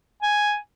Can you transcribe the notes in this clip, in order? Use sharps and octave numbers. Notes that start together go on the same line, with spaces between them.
G#5